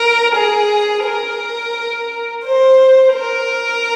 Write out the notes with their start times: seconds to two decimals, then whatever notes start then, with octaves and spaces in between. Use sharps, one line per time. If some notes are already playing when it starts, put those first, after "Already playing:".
Already playing: A#4
0.34 G#4
1.04 A#4
2.44 C5
3.14 A#4